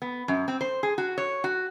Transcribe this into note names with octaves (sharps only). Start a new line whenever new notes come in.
B3
F#2
C4
C5
G#4
F#4
C#5
F#4